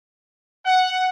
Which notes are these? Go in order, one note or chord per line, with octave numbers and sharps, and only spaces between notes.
F#5